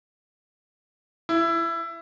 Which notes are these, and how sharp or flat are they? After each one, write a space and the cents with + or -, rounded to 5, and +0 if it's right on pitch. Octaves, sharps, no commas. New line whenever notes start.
E4 +20